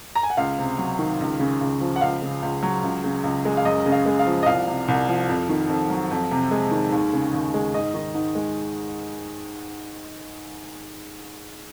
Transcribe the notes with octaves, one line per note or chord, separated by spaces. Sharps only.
A#5
G#5
F#5
C#2 F5
C3
F#3
D#3
C#2
C#3
C#2
F3
F#5
C#2 F5
C#3
C#2
F#3
C#2
C#3
C#2
G#3
F5
F#2 D#5
C#3
F5
G#3
F5
F3
D#5
C2 F5
C3
C2
F3
F2
D#3
F2
F#3
F2
C3
G#3
D#3
D#2
C#3
D#2
G#3
G#2 D#5
D#3
G#2
G#3